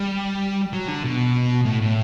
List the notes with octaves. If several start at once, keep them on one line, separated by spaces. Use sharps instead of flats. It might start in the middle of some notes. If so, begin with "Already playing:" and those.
Already playing: G3
F#3
D3
B2
A2
A2